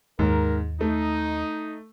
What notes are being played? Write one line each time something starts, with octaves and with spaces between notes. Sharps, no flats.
D#2 G#2 A#4
A3 D#4